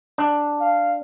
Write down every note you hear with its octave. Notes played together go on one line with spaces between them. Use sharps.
D4
F5